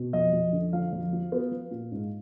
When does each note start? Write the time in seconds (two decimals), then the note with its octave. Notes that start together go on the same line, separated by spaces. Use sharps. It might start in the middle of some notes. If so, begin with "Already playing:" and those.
Already playing: B2
0.13 F2 D#5
0.33 F2
0.53 D3
0.73 F3 F5
0.92 F2
1.13 F3
1.32 B3
1.51 F3
1.71 A#2
1.92 G#2